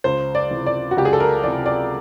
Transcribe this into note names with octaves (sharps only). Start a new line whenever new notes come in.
C#2 C5
D5
C3 E3
D5
F#4
C#2 G4
G#4
A4
A#4
C3 E3 D5
D5